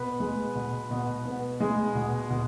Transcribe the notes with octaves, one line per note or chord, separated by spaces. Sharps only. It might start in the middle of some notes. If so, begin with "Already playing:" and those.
Already playing: B2 B3 B4
G#3
B2
B2
B3
G#3
B2
B2